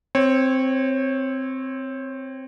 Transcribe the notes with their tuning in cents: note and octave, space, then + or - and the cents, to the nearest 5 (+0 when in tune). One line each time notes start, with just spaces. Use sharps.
C4 +0 C#5 -20